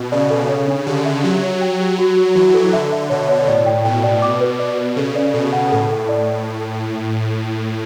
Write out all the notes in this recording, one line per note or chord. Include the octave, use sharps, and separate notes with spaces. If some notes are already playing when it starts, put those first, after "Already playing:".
Already playing: B2
C#3 D5
A4
C#5
D4
D3 G4
E5
F#3 G4
C#5
G5
G4
F#4
F#4
E3 F#4
A4
D3 E5
E5
B2 C#5
C#5
A2 D5
G5
B2 G5
D5
B2 D6
B4
B2 D5
B4
C#3 A4
D5
B2 A4
F#5
A2 A4
A4
D5